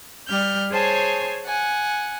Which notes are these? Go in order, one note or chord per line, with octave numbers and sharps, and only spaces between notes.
G3 F6 G6
G#4 C5 C#5 G#5 A5
F#5 G#5